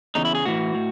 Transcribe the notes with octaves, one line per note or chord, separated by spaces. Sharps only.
E2 C#3 D#4
E4
G#4
A2 E3 F#4
A2